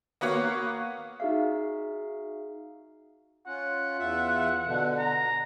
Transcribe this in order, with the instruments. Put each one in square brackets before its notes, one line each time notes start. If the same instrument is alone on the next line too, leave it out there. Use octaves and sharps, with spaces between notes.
[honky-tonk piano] A#3 B3 F#4 C#5 F5
[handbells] D#4 F#4 G#4 E5 F5
[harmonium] C#4 F4 [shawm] F#5
[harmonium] E2 F4 E5
B2 D3
[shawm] A#5